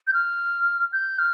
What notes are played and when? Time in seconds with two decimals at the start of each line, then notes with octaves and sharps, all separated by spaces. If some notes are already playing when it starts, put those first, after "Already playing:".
0.07 G6
0.13 F6
0.93 G6
1.19 F6